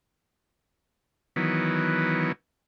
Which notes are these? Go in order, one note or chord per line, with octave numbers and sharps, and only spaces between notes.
D#3 E3 F#3 B3